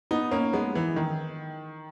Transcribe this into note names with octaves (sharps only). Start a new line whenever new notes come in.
B3 D#4
A#3 C#4
G#3 B3
E3
D#3